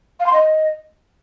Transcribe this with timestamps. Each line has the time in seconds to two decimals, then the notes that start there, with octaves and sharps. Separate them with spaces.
0.20 F5
0.26 C6
0.33 D#5